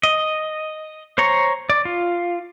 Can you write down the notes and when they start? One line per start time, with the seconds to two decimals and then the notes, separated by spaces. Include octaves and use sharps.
0.03 D#5
1.18 C5 C#5 A#5 C#6
1.70 D5
1.85 F4